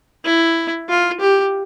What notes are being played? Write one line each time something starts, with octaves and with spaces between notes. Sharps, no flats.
E4
F4
G4